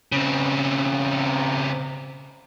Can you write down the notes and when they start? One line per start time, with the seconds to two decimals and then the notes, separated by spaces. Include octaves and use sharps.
0.12 C#3 C4